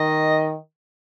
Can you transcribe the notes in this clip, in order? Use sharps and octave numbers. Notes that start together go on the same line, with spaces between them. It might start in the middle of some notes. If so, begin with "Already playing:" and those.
Already playing: D#3 D#5